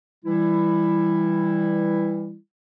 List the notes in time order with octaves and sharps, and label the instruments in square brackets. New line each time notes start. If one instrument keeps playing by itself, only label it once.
[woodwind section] E3 G3 E4